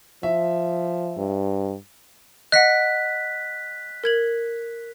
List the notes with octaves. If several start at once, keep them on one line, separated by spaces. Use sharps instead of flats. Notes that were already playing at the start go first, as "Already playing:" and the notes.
F3 E5
G2
D#5 F#5 F#6 B6
A#4 G#6 F#7